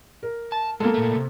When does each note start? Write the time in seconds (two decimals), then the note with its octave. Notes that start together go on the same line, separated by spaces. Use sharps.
0.23 A#4
0.52 A5
0.80 G#3 A#3 F4 A4
0.94 A#2 A3
1.16 C3